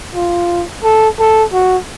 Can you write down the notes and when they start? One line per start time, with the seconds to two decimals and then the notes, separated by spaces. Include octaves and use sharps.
0.15 F4
0.84 A4
1.20 A4
1.53 F#4